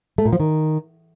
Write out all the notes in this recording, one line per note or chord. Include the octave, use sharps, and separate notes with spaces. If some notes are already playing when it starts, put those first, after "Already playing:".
A3
A#2
F3
D#3